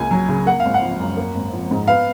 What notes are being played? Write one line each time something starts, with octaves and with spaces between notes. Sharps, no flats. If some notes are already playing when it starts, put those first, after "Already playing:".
Already playing: C#2 A#3 G#5
F#3
C#3
A#3 F#5
F5
G#1
F#5
F3
F#2
A#3
G#1
F3
G#2
B3 F5